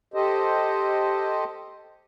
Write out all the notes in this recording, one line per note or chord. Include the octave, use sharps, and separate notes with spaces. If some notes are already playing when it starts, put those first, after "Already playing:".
G4 A4 C5 D#5